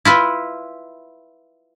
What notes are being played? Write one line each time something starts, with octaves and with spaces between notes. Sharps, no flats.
E4 F4 B4